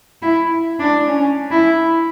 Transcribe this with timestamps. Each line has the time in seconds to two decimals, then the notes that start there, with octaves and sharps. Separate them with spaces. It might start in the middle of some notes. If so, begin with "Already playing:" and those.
0.22 E4
0.80 D4
1.08 C#4
1.51 E4